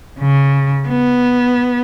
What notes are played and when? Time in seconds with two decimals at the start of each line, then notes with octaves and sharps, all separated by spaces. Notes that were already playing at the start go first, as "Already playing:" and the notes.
0.19 C#3
0.88 B3